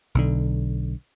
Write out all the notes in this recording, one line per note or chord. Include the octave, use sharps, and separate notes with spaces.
B1 D3